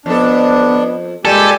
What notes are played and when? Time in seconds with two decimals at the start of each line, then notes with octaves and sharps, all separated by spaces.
0.06 F2 B3 D4 A4
1.25 A#2 G3 G#3 G4 A4 G#5